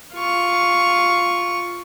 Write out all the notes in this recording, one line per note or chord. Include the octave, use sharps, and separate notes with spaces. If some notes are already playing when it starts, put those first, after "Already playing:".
F4 C#6